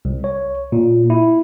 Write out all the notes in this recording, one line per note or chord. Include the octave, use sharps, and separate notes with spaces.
C2
C#5
A#2
E4